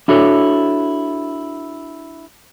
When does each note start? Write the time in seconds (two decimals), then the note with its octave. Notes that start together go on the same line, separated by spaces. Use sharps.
0.08 D4 E4 F#4 A4 C#5